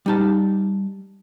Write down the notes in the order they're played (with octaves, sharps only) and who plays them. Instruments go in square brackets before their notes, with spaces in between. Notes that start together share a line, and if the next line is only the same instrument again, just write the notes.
[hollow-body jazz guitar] G3 D#4 A5